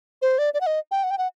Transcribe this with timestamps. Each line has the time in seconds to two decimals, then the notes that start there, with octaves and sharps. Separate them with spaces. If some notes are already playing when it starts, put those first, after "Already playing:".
0.22 C5
0.38 D5
0.54 D5
0.61 F#5
0.67 D#5
0.91 G5
1.04 F#5
1.11 G5
1.18 F#5